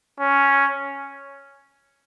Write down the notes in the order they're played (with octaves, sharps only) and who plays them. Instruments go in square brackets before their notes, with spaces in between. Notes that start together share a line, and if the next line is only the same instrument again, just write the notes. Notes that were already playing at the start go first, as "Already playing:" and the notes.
[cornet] C#4